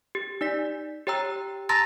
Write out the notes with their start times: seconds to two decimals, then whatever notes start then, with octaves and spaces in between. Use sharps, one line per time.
0.15 G4
0.41 D#4 D5 B6
1.07 G4 C#5 G5 A#5 E6
1.69 A5 A#5 C6 E6 A6 A#6